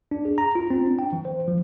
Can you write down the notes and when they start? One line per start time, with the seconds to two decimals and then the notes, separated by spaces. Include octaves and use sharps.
0.11 D4
0.25 G#4
0.38 A#5
0.55 F4
0.70 C4
0.87 D4
0.99 G5
1.13 E3
1.25 C5
1.48 F3